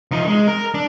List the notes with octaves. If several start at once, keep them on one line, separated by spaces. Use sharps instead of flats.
F3 D#4
G#3
A#4
D4